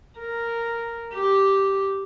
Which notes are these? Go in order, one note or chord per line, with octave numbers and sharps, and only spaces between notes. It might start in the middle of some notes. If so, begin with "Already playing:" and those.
A#4
G4